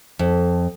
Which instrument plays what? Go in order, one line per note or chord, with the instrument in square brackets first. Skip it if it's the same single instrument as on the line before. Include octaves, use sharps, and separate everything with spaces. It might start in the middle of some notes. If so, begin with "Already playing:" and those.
[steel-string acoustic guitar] F2